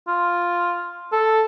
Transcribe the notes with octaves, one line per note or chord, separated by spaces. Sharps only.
F4
A4